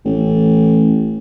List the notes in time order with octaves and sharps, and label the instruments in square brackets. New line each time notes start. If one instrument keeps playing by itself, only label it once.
[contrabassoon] A1